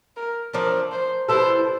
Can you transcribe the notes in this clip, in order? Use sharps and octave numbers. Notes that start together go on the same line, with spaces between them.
A#4
F3 A3 D4 A#4
C5
G3 B3 E4 A4 C5